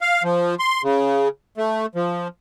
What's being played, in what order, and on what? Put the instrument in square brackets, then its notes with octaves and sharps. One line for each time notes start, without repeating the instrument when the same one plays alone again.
[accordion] F5
F3
C6
C#3
A3
F3